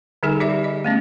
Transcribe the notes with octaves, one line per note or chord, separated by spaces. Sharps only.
D3 G3 D#4 G#4 A4 G#5
D#4 G4 D5 E5
D#5
A3 B3 C#4